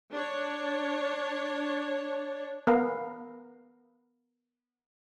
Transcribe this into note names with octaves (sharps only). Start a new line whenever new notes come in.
D4 C#5
B3 A#4 F5